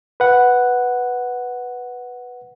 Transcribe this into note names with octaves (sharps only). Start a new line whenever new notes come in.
B4 F#5